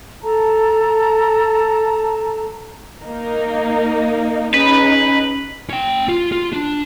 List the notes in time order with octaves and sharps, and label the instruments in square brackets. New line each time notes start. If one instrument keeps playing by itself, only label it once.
[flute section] A4 A5 A#5
[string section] A#3 D#4 A#4
[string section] C#4 D#4 G#4 [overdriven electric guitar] B4
[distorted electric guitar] C#4 G5
F4
F4
D4